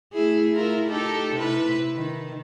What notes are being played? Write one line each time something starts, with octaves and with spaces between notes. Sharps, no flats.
A3 E4 G#4
E4 F4 A#4
D#4 G4 A4
C3 E4 B4
D#3